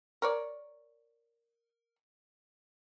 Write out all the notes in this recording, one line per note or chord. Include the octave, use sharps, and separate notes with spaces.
A#4 C#5 D5